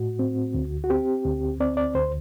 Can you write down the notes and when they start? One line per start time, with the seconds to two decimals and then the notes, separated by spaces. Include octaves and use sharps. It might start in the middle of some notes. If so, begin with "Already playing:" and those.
Already playing: A2 F#4
0.19 C4
0.54 D2
0.84 F#4
0.90 C4 G4
1.25 D2
1.60 C4 D5
1.77 D5
1.95 D2 C5